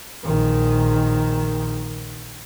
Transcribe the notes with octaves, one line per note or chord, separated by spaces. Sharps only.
A#1 D#3